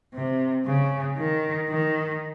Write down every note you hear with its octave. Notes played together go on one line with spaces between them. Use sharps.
C3
C#3
D#3
D#3